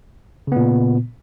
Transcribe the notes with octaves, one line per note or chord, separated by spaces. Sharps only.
A#2 C#3 B3